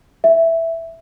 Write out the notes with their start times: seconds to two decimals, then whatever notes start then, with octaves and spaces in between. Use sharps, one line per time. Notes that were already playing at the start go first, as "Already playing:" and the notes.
0.24 E5